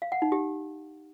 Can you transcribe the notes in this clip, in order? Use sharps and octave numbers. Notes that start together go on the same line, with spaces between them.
F5
F#5
D#4
G4